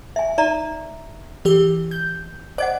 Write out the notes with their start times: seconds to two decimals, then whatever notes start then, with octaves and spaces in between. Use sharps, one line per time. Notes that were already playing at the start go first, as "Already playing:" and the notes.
0.16 E5 G#5
0.38 D#4 D5 E5 A#5
1.45 E3 G4
1.91 G6
2.58 C5 D5 D#5 F#5 D6